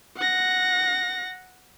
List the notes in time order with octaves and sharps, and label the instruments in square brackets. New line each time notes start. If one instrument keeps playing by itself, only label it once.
[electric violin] F#5 A#6